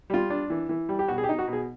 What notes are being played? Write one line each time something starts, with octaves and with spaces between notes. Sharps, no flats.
G3 F4
D4
E3
E3
G3
G4
B2 F#4
G#4
G4
D#4
F#4
B2
G#4